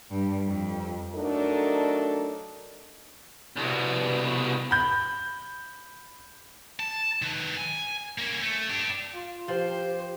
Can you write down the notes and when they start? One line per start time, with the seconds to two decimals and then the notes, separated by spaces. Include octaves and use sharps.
0.10 G2
0.46 F2
1.15 F#3 A3 D4 D#4 A4 A#4
3.57 C2 B2
4.71 B5 G6
6.80 A5
7.22 D#3 B4
7.57 G#5
8.18 A#3 C#4
8.41 A3
8.69 D4 G4
9.14 F4
9.48 F3 G4 C5